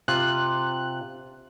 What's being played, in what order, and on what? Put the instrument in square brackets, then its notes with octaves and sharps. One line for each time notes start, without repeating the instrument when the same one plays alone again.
[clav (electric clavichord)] C3 F4 [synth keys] F#6